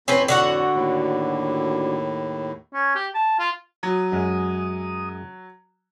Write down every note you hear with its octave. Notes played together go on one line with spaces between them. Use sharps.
F2 A2 C4 C#4 B4
D3 F#4 F#5
D#2 A2
C#4
G4
A5
F4
F#3 D#6
F#2 G#3